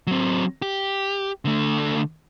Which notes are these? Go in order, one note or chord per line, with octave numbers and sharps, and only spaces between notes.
F#3 C4
G4
D3 A3